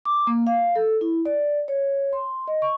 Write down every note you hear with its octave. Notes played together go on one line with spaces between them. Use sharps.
D6
A#3
F5
A4
E4
D5
C#5
C6
D#5
C#6